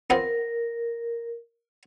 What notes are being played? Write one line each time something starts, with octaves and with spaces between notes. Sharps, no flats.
B3 C4 F4 A#4